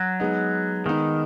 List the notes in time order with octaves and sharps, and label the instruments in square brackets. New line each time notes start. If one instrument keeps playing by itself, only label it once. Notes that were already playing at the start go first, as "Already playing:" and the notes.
Already playing: [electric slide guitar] F#3
[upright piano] G#3 B3 D#4
[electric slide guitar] D#3 [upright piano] G#3 B3 D#4